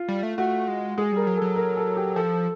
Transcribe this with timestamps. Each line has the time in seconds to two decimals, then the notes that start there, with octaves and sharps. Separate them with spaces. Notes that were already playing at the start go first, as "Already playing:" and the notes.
Already playing: F4
0.08 G3
0.23 A3
0.38 A3 F#4
0.68 G#3
0.98 G#3 G#4
1.12 G3 A#4
1.27 F#3
1.37 F#3 A4
1.56 A#4
1.77 A4
1.97 G4
2.16 F3 A4